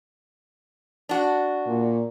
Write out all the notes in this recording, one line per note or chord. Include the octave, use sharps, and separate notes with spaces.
D4 F#4
A#2